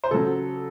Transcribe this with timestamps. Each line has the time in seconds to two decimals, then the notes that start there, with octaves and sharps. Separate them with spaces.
0.04 C5
0.11 C#3 F#3 A4